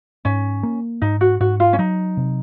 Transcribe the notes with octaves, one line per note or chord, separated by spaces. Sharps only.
G#2 C#4
A#3
G#2 D#4
F#4
G#2 F#4
F4
C#4
F#3 D#4
C3